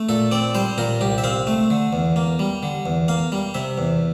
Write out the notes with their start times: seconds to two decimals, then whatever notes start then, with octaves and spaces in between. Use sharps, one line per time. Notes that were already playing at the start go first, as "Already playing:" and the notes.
Already playing: A3
0.09 A#2 A4
0.32 C4 D5
0.55 G3 C5
0.78 A#2 A#4
1.01 C2 G4
1.18 E5
1.24 C4 F5
1.47 A3
1.70 D3
1.93 E2
2.16 A#3
2.39 G3
2.63 D3
2.86 E2
3.08 A#3 F5
3.32 G3
3.54 C3 E5
3.78 E2